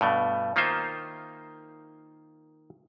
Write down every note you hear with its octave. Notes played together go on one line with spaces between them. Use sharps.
G2 B2 A3
D#3 A#3 D#4 F4 C5 E5